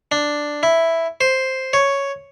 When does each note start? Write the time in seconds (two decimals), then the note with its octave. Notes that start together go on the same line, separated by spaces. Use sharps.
0.12 D4
0.63 E4
1.21 C5
1.73 C#5